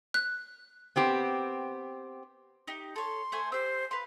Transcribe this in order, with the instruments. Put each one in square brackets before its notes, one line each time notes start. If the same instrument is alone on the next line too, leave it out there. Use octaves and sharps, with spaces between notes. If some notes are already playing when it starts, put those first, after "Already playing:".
[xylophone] F#6
[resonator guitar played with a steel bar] B3 C4 G4
[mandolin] D#4 G4
[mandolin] A4 C#5 [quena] C6
[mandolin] A3 C5 G#5
[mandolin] G4 E6 [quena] C5
[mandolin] B4 F5 C6